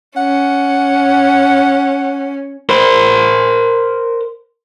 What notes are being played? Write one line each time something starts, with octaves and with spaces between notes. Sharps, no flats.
C#4 F#5
A#4 C5